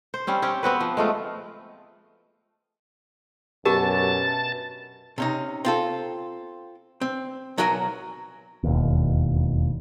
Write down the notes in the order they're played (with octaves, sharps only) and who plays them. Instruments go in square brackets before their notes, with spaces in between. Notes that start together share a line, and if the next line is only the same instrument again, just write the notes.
[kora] C5
G3 C4 C#4
C4 C#4 G4
B3 C4 F#4 B4
F3
G#3 A3 F4
[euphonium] F#2 [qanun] B2 D4 G#5 [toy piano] F#4 G4 A#4 [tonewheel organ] A5
[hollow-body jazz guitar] C3 C#4 D#4
C4 F4 A4
C4
B1 F#3 F#4 A#4 E5 G#5
[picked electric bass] E1 D#2